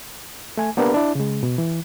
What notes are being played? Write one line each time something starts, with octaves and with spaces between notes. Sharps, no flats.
A3 G#5
A#3 B3 D4 G4 A#4 B4
D4 E4
C#3 G#3
B2
E3